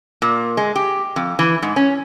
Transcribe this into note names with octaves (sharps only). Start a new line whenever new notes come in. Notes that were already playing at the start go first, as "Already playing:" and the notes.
A#2
G#3
G4
F2
E3
G#2
C#4